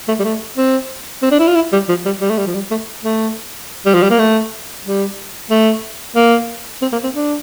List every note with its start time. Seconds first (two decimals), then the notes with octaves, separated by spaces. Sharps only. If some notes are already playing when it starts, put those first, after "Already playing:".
0.08 A3
0.19 G3
0.24 A3
0.57 C4
1.23 C4
1.31 D4
1.39 E4
1.48 F4
1.55 E4
1.72 G3
1.89 F3
2.05 G3
2.21 G3
2.30 A3
2.38 G3
2.46 F3
2.55 G3
2.71 A3
3.04 A3
3.86 G3
3.94 F3
4.03 G3
4.10 A#3
4.19 A3
4.85 G3
5.50 A3
6.16 A#3
6.82 C4
6.92 A#3
7.04 C4
7.15 D4